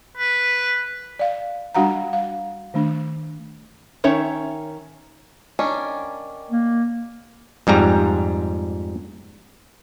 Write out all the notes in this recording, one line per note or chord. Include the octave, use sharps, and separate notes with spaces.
B4
D5 F5
G3 D4 F#4 F5 F#5 A#5
F5
D#3 A3 D4
D#3 C#4 C#5 E5
D#3 C#4 D4
A#3
F2 G#2 G3 A#5